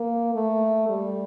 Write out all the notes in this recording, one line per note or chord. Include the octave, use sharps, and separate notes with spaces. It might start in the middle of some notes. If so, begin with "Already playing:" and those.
Already playing: A#3
A3
G3